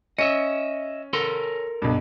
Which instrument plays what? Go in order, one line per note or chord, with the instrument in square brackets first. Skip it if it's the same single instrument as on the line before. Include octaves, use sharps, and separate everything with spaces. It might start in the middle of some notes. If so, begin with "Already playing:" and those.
[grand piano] C#4 C#7 [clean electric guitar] D#5 E5
[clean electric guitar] A4 A#4 C6
[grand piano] B1 G2